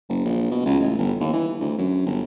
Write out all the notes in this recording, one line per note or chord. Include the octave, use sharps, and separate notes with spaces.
F#1
A#1
B2
C#2
A1
G1
D#2
E3
D2
F#2
G1